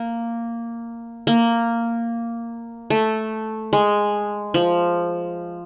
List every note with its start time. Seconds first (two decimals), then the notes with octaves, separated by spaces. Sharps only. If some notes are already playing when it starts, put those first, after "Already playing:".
Already playing: A#3
1.27 A#3
2.90 A3
3.73 G#3
4.54 F3